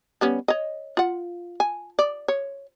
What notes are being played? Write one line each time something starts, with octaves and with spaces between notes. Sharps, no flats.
G3 B3 C#4
C#5 D#5
F4 F#5
G#5
D5
C#5